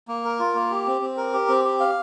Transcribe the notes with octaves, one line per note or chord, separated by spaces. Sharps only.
A#3
A#4
F4
A#3
G4
C4
C4
A#4
G4
C4
G4
F5